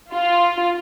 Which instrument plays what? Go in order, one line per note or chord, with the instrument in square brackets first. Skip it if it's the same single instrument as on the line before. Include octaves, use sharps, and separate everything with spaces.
[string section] F4